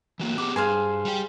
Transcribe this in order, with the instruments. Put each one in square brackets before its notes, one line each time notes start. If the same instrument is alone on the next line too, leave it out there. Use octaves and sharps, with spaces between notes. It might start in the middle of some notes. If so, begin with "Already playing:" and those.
[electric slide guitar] E3 F#3 A#3
[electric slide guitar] B3 G4 G#4 [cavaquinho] D6
[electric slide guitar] G2 [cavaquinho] G#4 C5 F5
[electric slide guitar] G3 G4